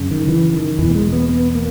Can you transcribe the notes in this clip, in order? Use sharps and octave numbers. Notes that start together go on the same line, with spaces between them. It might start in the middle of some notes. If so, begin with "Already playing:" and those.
Already playing: F#2 C#3
D#3
E3
D#3
E2 B2 E3
A#3
G#3
B3
B3
A#3